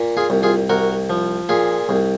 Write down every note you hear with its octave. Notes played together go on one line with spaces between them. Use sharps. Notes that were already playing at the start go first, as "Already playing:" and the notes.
Already playing: A#2
F4 G#4
C2
F4 G#4
C2 F#4 A#4
F3
A#2 F4 G#4
C2